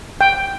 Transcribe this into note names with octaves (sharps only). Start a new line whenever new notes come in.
G5